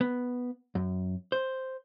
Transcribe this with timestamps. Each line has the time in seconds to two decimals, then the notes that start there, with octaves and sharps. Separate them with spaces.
0.01 B3
0.75 F#2
1.32 C5